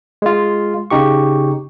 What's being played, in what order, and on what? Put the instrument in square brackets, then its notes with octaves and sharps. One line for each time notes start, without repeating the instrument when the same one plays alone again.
[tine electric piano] G#3 F4
C#3 D#4 G4 C#6